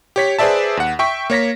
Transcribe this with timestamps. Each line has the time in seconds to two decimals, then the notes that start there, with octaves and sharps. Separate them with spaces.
0.16 G4 C#5 B6
0.39 G#4 B4 C5 D5 E5 A5
0.77 D#2 F#5
0.99 E5 G5 C#6 B6
1.30 A#3 C#5 A#6 B6